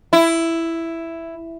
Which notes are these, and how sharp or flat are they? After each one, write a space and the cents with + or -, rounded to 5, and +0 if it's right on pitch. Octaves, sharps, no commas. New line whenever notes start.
E4 +5